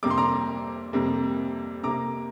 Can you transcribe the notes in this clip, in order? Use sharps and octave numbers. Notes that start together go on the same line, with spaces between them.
F2 C3 G3 A#3 D6
C6
A#5 D6
F2 C3 G3 A#3
C3 A#3 A#5 D6